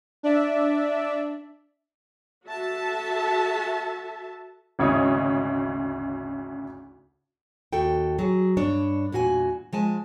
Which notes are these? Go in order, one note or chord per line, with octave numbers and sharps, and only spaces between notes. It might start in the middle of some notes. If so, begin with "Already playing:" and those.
D4 D5 E5
F#4 A4 E5 A5
G#1 D2 C#3 C#5 D#5 D#6
D#2 F#4 A4 G5
F#3 G#4
G2 D4 C#5
E2 A#2 F#4 A4 G#5
F3 G#3 G#5 A5